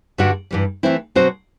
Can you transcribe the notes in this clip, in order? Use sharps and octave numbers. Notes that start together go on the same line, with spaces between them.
G2 D3 G3 D4 F#4
G2 E3 G3
E3 A3 C4 E4
B2 F#3 C4 F#4 C5